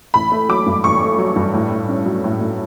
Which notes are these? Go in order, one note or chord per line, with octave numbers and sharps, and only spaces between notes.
A1 B5
A3
F#3 D6
G2
A1 C#6
A3
F#3
G2
A2
A2
C#4
F#3
A2
A2